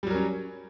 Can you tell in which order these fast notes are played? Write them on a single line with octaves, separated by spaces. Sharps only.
G3 F#3 A#4 C#4